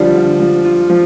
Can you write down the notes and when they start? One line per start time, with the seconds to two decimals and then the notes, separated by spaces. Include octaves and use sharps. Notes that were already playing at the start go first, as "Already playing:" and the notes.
Already playing: D3 F3 G3 F4
0.14 D3
0.40 F3
0.65 F4
0.90 F3